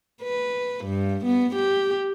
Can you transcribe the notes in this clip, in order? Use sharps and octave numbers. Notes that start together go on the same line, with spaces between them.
B4
G2
B3
G4